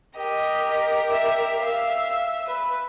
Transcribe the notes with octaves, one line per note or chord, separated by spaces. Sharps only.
G4 A#4 D#5
E5
E5 F5
B4